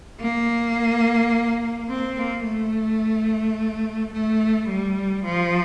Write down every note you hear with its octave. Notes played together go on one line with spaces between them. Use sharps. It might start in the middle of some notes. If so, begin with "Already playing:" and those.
A#3
C4
A#3
A3
A3
G3
F3